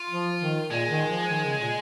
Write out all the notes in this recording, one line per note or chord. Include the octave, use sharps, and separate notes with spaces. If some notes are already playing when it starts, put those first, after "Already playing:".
Already playing: F4
F3
D#3
A#2 G#3
D#3
F3
D#3
C#3
A#2